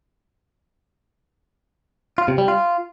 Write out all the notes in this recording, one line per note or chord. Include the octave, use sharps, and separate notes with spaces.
F4
C3
G3
F4